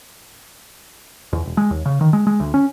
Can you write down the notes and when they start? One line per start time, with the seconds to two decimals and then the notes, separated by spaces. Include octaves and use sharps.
1.33 E2
1.46 E1
1.57 G#3
1.71 D#2
1.86 C#3
2.01 D#3
2.13 G#3
2.27 G#3
2.40 D2
2.54 C#4